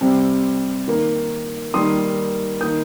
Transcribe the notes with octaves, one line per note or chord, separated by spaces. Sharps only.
C3 G3 C4
D#3 A#3
D#3 G3 A#3 C6 D#6
D#3 A#3 D#6 G6